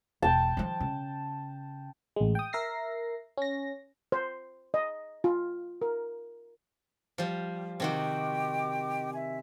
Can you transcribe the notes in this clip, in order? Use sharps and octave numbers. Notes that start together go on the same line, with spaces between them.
E1 G5 A5
D#3 F3
C#3
A1 G#3
G5 D#6
A#4 E5 A#6 C7
C#4 A#6
C5
D#5
F4
A#4
F3 G3
C3 D#3 F#4 D#5 G5 D6
E5 G#5